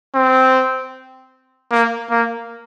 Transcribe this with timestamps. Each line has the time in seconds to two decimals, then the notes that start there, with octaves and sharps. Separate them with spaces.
0.15 C4
1.71 A#3
2.11 A#3